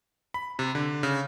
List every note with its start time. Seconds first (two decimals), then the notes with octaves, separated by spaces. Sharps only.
0.34 B5
0.59 C3
0.75 D3
1.03 C#3